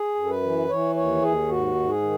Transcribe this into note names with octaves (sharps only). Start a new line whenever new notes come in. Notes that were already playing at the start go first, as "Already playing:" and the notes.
Already playing: G#4
F#2
A4
B4
E3
E3 C#5
D#2 C#5
D#2 G#4
G#2 F#4
G#2
G#4
D#3